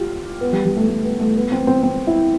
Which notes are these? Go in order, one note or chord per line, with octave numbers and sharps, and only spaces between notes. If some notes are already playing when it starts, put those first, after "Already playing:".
Already playing: F4 G4
B3
G3
G3
A3
A3
B3
A3
B3
C4
C4
C4
E4